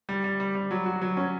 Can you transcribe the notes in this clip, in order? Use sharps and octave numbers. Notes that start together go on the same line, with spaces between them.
G3
G3
G3
G3
F#3
F#4
F#3
C#4